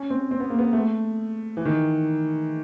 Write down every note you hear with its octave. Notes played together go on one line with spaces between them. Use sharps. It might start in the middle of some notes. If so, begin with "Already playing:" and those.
Already playing: C#4
C4
C4
B3
A#3
B3
A3
E3
D#3